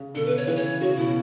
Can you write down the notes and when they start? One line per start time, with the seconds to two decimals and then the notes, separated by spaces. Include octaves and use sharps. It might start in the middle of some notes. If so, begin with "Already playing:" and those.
Already playing: C#3
0.14 B2 D3 A4
0.26 B4
0.37 C#5
0.47 C#3 E3 B4
0.56 C#5
0.80 C#3 F#4
0.97 B2 E4